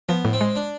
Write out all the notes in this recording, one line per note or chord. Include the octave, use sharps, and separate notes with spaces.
F3 B3
A2
C4
G#3
D4